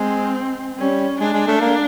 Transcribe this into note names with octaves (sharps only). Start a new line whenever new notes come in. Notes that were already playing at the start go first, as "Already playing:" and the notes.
Already playing: G#3 C4
G3 C#4
G#3 D4
G#3
A3
A#3